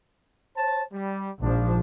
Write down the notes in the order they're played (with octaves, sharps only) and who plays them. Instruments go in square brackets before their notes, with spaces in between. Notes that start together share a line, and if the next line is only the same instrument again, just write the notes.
[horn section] C5 C#5 A5
G3
[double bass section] A#1 F3 [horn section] G#2 D4